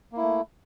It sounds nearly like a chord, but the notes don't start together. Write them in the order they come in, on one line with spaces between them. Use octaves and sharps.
A#3 E4 A3